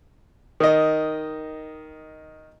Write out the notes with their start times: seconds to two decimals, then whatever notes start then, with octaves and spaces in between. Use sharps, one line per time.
0.60 D#3 D#5